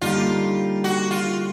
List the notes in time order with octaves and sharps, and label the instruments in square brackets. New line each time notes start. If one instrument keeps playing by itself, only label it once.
[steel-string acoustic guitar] D3 G3 A#3 D#4 G4 [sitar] F4
[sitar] F#4
F4